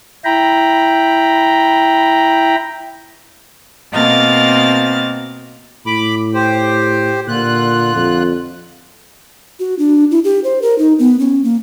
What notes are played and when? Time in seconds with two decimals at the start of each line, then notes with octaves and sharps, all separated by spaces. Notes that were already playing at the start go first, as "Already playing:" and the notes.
0.24 E4 G5 A#5 B5
3.91 B2 A#3 C4 D#5 F6 A6
5.86 A2 B5 D6
6.34 G4 C5
7.28 A#2 D3 F4 F#6
7.95 F2
9.60 F#4
9.79 D4
10.11 E4
10.24 G4
10.44 C5
10.62 A#4
10.79 D#4
10.99 B3
11.19 C#4
11.44 A#3